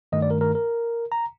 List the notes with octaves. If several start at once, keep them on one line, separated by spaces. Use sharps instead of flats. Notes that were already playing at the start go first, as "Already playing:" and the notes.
G2 D#3 A3 D#5
D5
A#4
A#4
A#4
A#5